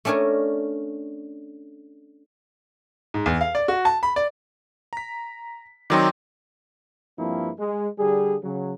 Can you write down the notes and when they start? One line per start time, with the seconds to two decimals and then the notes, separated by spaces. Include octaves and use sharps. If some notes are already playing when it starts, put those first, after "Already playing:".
0.05 A3 C#4 D4 A#4 G#5
3.14 G#2
3.26 E2
3.41 F5
3.55 D5
3.68 F#4
3.85 A5
4.03 B5
4.16 D5
4.93 A#5 B6
5.90 D#3 F#3 C4 D#4 D5
7.19 G2 F3 A#3 C4 E4
7.59 G#3
7.99 D3 G3 G#4
8.44 C#3 F#3